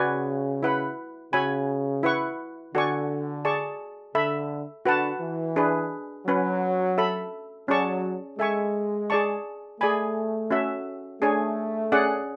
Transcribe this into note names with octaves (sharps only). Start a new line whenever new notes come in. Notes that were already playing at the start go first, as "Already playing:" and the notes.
Already playing: C#3 F#4 B4 D5 G#5
E4 B4 F#5 B5
C#3 F#4 C#5 G#5 B5
E4 B4 F#5 C#6
D3 F#4 A4 D5 G#5 C#6
G#4 D5 A5 C#6
D3 A4 E5 B5
D3 F#4 B4 F#5 A5
E3
D4 G#4 B4
F#3 C#4 F#4 B4
A4 E5 B5
F#3 C#4 G#4 D5 A5 C#6
G#3 A4 E5 G#5 C#6
G#4 D5 A5 C#6
A3 G#4 D5 G#5 B5
C#4 F#4 A4 E5
A3 D4 G#4 C#5 G#5
C#4 G#4 D5 F#5